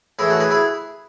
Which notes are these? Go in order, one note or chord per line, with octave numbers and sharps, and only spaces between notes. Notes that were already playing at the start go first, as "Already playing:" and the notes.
A2 E3 E4 G#4
F#4 A4
G#4 B4
E4 G#4